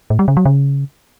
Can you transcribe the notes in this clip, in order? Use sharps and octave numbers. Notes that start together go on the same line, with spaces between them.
A2
G3
C#3
F#3
C#3